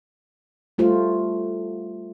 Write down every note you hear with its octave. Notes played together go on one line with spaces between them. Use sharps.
G3 A3 F4 C5